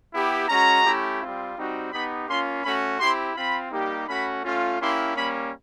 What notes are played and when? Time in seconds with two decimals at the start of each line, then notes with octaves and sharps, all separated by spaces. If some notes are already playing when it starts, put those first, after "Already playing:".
0.13 B3 E4 G4
0.49 G#3 C#4 F#4 A#5
0.85 A3 C#4 E4 G4
1.21 G3 C4 F4
1.56 G3 C4 D#4 F#4
1.92 B3 D#4 G4 B5
2.28 A#3 C#4 F4 C6
2.64 A3 C#4 F#4 B5
3.00 C4 E4 G4 C6
3.36 C4 F4 B5
3.72 G3 A#3 D#4 G4
4.08 A3 C#4 F#4 B5
4.44 A3 C#4 F4
4.79 A#3 C#4 E4 G4 C6
5.15 G3 A#3 C#4 B5